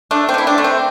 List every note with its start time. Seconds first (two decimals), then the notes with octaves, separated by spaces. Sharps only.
0.11 A3 D4
0.29 C4
0.34 D3 E4
0.47 D4
0.58 A3
0.64 C4